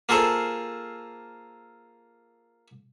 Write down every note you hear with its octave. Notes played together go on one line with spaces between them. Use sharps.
A#3 F4 G#4 A4 C5